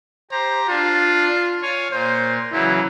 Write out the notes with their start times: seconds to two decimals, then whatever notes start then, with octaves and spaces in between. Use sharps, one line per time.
0.31 G4 C5 A#5
0.68 D4 F4
1.62 C#5 F5 G#5
1.92 A#2 C5
2.52 C#3 E3 F#3 E4